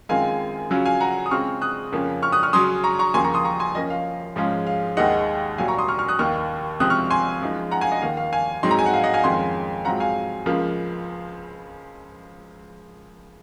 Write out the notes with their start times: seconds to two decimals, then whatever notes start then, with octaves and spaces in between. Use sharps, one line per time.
0.09 F#2 D#3 G#3 C4 F4 F5 G#5
0.70 C#3 F#3 C#4 F4
0.85 F5 G#5
1.00 F#5 A#5
1.26 D#6
1.31 C#3 G#3 C4 F4 C#6 F6
1.62 D#6 F#6
1.92 F2 C#3 F3 A#3 C#4
2.23 C#6 F6
2.32 D#6 F#6
2.43 C#6 F6
2.53 C#3 F#3 C#4 C6 D#6
2.84 A#5 C#6
2.99 A#5 C#6
3.14 D#2 C#3 F3 A#3 G#5 C6
3.24 A#5 C#6
3.34 C6 D#6
3.45 A#5 C#6
3.60 G#5 C6
3.75 F#2 F3 A#3 C#4 D#5
3.90 F5
4.36 G#2 F3 G#3 C#4 F4
4.67 F5
4.97 D#2 D#3 G#3 D#4 D#5 F#5
5.58 C2 A#2 F#3 F5 G#5
5.68 A#5 C#6
5.78 C6 D#6
5.88 C#6 F6
5.99 C#6 F6
6.08 D#6 F#6
6.19 D#2 D#3 A#3 C#6 F6
6.80 C#2 C3 F3 C4 D#6 F#6
6.90 C#6 F6
7.10 G#5 C6
7.41 F#2 F3 G#3 D#4
7.71 F#5 A#5
7.81 F5 G#5
7.92 D#5 F#5
8.02 D#2 D#3 A#3 F5
8.17 F5
8.33 F5 G#5
8.63 G#2 F#3 C4 D#4 C6
8.71 A#5
8.79 G#5
8.86 F#5
8.94 F5
9.04 D#5 F#5
9.14 F5 G#5
9.24 F2 D#3 G#3 C#4 F4 G#5 C6
9.85 G#2 F#3 C4 F4 F#5 A#5
10.00 F5 G#5
10.46 C#2 C#3 F3 A#3 F4